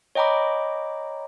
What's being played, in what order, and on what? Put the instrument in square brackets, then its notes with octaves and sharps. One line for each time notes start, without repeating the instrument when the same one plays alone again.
[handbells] C#5 D#5 G5 A#5 B5 D6